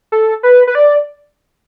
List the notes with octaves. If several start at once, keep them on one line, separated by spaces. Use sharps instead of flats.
A4
B4
B4
D5